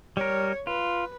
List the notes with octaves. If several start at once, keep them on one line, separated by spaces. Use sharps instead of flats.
G3 A#4 C#5
F4 B4